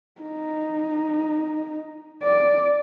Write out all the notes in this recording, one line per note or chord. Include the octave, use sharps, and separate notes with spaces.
D#4
D5